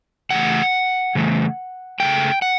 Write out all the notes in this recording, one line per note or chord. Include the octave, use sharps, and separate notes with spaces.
C#3 E3 A3 F#5
C#3 E3 A3
C#3 E3 A3 G5
F#5